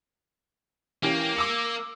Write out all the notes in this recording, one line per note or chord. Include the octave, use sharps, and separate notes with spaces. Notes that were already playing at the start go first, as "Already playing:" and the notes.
E3 A#3 C#4 G4
D6 E6 C#7